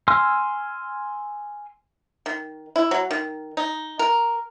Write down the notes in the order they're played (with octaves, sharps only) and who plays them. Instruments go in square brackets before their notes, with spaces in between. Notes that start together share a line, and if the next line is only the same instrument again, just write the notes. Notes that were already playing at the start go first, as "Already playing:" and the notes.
[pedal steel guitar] G#5 C6 E6 F6
[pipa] D#3
E4
F#3
D#3
D#4
A#4